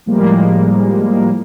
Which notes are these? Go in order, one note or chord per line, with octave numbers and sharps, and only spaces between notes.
A2 F3 G3 G#3 A#3